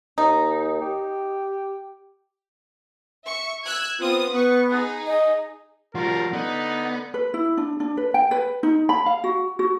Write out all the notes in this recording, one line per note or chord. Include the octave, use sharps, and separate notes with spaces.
D#2 D#4
G4
E5 C#6
E6 F#6 G#6
B3 C4 F4 D#6
B3 B4 C#6
D#4 G#4
D#5
F3 G3 F#4 A#4
D3 B3 D#4
B4
E4
D4
D4
B4
G5
B4
D#4
B5
F5
F#4
F#4